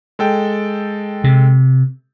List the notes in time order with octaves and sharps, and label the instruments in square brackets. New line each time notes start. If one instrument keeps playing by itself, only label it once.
[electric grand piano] G#3 A4 G5
[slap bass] C3